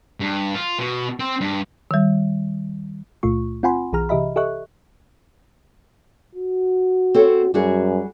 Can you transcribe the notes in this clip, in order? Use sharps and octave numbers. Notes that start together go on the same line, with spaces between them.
G2
F4
B2
C4
G2
D#3 G3
C#2 A#2 A3 F4 C#6
C4 F4 F#5 G#5 B5 C6
B1 E3 G#4 A#5 F6
C3 E3 G4 D#5 E5 B5
G4 A4 D#5 E5 C#6 F#6
F#4
C4 A4 C#5
F#2 G3 F#4 G#4